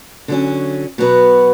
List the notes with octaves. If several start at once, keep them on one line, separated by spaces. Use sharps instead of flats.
D3 F#3 C#4
B2 F#3 B3 F#4 B4